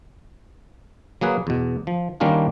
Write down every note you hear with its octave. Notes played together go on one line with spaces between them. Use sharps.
F#3 A#3 G#4 B4
E2 B2
F3
D#3 G3 A#3 C#4 D4 F4